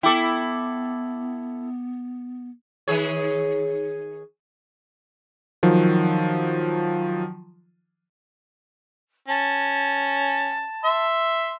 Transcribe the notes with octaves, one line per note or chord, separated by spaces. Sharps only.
B3 E4 A4 G5 D6
D#3 G#4 C#5
D#3 F3 F#3
C#4 A5
E5 C6